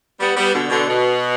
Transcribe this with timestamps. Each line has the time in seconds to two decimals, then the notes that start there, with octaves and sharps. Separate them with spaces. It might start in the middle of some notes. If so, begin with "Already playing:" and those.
0.20 G3 B3
0.36 G3 B3
0.53 B2 D3
0.69 B2 D3
0.86 B2